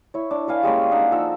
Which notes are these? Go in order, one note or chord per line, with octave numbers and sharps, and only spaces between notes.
E4 C#5
D4
B4 C#5 F5 G#5
G3 G#3 A#3 C#4
D4 D#4 F#5 G#5
F3 D#4 A4 E6